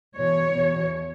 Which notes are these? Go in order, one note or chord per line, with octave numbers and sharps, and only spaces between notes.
E2 B2 C#5
E2 B2